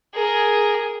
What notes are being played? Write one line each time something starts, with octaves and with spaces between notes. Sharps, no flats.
G#4 A#4